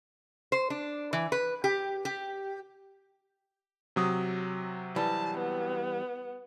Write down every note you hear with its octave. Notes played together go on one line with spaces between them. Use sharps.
C5
D4
E3
B4
G4
G4
C3 F#3 D#6
E3 G3 A5
B3